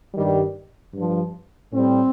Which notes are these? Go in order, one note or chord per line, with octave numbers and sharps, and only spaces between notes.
G2 D#3 G3
G2 F3
A2 G3 C4